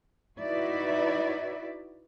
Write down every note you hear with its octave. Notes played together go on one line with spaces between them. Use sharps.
D#4 E4 F#4 B4 D5 E5